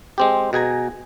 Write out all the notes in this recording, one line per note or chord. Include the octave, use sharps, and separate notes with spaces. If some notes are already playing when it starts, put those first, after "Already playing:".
G#3 C4 G4
B2 G#4 G#5 A#5